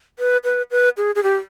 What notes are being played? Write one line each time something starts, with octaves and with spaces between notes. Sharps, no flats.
B4
B4
B4
G#4
G#4
G4